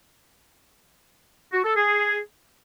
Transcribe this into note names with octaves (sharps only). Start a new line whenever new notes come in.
F#4
A4
G#4